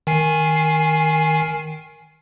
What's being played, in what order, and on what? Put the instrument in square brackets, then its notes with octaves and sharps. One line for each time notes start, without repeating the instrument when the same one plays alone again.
[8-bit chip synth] D#3 G#5 C7